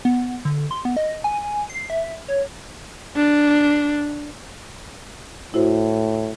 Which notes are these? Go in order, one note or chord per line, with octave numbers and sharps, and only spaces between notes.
B3
D3
C6
B3
D#5
G#5
C7
E5
C#5
D4
A2 E4 F#4 C5